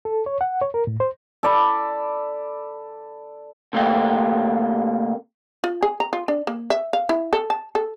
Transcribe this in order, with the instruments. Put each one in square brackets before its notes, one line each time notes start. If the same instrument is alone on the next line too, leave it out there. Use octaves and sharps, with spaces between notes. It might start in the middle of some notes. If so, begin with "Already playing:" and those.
[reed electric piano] A4
C#5
F#5
C#5
A#4
A2
C5
[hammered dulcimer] A4 D5 B5
[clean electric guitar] C3 A3 A#3 G4
[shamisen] F4
G#4
A#5
F4
D4
A#3
E5
F5
E4
A4
A5
A4